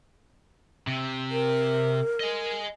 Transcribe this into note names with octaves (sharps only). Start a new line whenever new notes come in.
C3
A#4
D#5 G#5